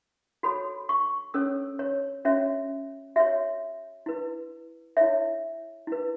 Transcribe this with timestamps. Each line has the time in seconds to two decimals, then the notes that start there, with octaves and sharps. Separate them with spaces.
0.43 F#4 A4 C#5 B5
0.89 C#6
1.34 C#4 A4 C#5 E6
1.79 C#5
2.25 C#4 F#4 C#5 E5
3.16 F#4 C#5 E5
4.06 E4 B4
4.97 E4 C#5 E5
5.87 E4 B4